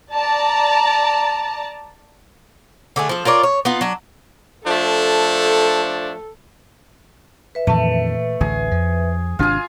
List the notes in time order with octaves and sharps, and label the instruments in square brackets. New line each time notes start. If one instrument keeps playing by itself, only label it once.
[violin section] D5 A5 A#5
[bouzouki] D3 A3 G#4
F3 A4
F4 A#4 C#5 D5
C#5
B3 D#4 F4
F#3 D4
[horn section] F3 A3 D4 [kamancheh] A4
[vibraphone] B4 E5
[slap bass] F2 D#3 [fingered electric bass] A#2 E3 [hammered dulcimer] A3
[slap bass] A1 D2 A2 [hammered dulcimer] G#4
[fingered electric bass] F2 [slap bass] F3
[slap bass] G#1 C3 D4 [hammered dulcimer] F4 G#4